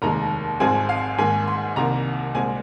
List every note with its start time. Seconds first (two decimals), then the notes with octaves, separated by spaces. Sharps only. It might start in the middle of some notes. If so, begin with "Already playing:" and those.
0.02 F1 D#2 D#3 G#3 A#5
0.60 G#1 G#2 F3 G#3 C4 G#5
0.89 F5
1.18 G#1 G#2 D#3 A#3 G#5
1.48 C6
1.76 C2 C3 D#3 A#3 A#5
2.35 C2 A#2 G#3 C4 G#5